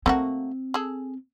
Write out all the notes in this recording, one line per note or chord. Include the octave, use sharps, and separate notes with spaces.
A3 A#3 C4 F#4
G#4 A4